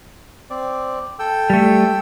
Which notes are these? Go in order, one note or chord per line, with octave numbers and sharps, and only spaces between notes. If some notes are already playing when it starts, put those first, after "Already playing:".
C4 D5
A4 G5 E6
G3 A3